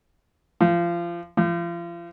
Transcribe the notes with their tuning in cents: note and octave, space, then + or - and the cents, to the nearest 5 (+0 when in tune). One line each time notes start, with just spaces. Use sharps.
F3 -25
F3 -35